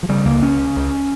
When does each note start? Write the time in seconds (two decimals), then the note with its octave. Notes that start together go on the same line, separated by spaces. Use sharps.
0.03 F3
0.09 C#3 G3
0.25 C#2 A#3
0.42 C#2 C#4
0.59 C#3
0.76 C#2